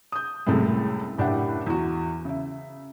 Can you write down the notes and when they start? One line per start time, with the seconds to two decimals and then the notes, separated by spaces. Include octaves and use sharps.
0.12 D#6 G6
0.47 C2 F#2 A2 C3 G#3 A3
1.18 F#1 A2 D4 G4 E5 F#5
1.67 E2 F#4
2.25 C#3 E5